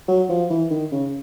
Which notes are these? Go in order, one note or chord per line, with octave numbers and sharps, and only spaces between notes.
F#3
F3
E3
D#3
C#3